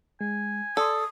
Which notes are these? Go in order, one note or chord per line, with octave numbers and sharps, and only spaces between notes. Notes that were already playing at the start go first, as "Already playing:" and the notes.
G#3 G#5
A4 D5 C6 D#6